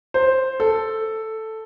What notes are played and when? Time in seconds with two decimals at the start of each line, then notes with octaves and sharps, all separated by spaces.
0.14 C5
0.60 A4